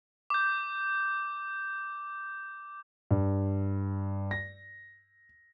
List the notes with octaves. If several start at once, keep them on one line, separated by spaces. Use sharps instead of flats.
D6 G6
G2
A#6